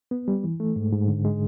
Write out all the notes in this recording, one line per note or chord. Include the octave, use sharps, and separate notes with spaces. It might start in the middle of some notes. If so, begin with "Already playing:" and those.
B3
G3
E3
A3
G#2
G#2
D3
G#3